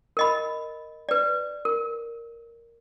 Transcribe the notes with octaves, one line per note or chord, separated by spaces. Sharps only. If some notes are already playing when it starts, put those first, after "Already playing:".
A#4 D#5 B5
B4 D5
A#4